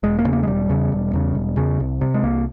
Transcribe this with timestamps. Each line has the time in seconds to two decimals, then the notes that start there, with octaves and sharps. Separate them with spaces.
0.03 E1 G#3
0.19 A#3
0.25 E2 C#3
0.33 A#3
0.43 G#3
0.47 E1 G3
0.69 E2 C#3
0.92 E1
1.13 E2 C#3
1.35 E1
1.57 E2 C#3
1.80 C2
2.01 C3
2.14 G#3
2.23 C2 A#3